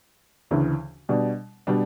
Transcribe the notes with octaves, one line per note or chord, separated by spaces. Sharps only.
D2 C#3 E3
B2 G3 D4
B2 G3 D4